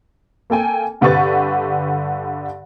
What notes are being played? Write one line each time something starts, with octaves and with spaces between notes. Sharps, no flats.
A#3 A4 G5 G#5
G2 D3 G4 B4 C#6 A6